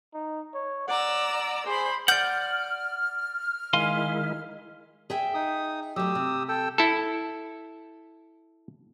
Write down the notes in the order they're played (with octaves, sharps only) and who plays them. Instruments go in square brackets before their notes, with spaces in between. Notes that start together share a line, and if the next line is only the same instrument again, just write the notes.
[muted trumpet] D#4
C#5
[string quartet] D5 A#5 E6 [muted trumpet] F#5
[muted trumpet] G#4 [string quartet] C5 B5
[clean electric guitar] D5 F#5 [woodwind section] F6 [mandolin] G6
[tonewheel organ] D#3 G#3 E4 [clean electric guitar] F5 G#5 C6
[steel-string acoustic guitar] G#4 E5 G5
[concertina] D#4 D#6
[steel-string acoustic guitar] F#3 A3 [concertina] G4 D#6 E6
[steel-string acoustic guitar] C3
[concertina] A4 G5 E6
[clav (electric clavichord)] E4 A4